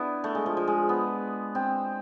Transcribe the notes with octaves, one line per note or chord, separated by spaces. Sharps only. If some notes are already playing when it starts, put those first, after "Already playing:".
Already playing: B3 D4 E4
A3
G#3
F3
F3
G#3
B3
C4